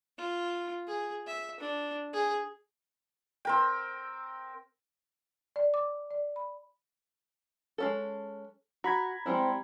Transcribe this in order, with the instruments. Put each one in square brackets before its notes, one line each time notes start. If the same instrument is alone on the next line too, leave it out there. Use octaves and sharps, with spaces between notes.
[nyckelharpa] F4
G#4
E5
D4
G#4
[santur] C4 A#4 G5
[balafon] D5
D6
D5
B5
[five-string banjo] G#3 C#4 A4
[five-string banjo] F#4 [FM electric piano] A#5 B5 G#6
[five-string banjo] G3 G#3 E4 [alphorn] C4